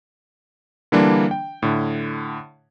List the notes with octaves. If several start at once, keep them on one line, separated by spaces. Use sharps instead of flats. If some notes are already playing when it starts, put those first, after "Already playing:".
D3 E3 G3 A#3 D4
G5
A2 D3